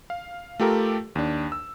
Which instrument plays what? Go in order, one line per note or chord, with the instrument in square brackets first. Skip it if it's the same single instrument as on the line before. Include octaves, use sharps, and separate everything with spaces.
[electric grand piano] F5
A3 F4 G4 A4 A#4
D#2 D4
E6